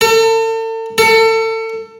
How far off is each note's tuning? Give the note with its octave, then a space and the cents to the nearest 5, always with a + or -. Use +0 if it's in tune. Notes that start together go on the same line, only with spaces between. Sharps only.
A4 +40
A4 +30